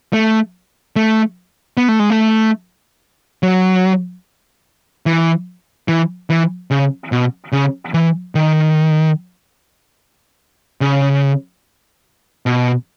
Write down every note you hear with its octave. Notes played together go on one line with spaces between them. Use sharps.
A3
A3
B3
A3
G#3
A3
F#3
E3
E3
E3
C#3
B2
C#3
E3
D#3
C#3
B2